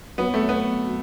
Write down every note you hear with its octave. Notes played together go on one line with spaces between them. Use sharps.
F#3 B3
A3
F#3
B3